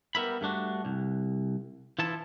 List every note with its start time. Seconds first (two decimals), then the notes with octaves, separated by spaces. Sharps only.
0.15 G3 B3 A#4 E5 B5
0.41 G2 A3 D4 F#4
0.85 C2
1.99 E3 F3 E4 A4 A5